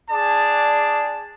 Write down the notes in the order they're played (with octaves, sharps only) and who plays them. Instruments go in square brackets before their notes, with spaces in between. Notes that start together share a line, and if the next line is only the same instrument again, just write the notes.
[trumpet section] D4 G#4 D5 A5